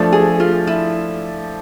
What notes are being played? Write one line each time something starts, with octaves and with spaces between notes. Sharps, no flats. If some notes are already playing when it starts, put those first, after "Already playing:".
Already playing: F3 A3 D4
G#4
F4
E4